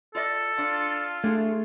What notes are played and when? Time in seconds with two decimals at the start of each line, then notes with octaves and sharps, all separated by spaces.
0.15 F4 A4 D5 D#5
0.58 D4 F4
1.24 A3 D4 G#4